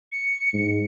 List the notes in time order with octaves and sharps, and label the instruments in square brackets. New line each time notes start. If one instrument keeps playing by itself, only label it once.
[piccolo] C#7
[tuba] G#2